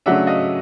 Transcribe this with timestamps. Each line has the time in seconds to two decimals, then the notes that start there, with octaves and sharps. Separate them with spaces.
0.06 C#3 F#3 A3 D4 E5 F#5
0.27 D#5 F5